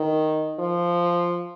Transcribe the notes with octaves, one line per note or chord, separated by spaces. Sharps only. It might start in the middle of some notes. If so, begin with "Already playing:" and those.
Already playing: D#3
F3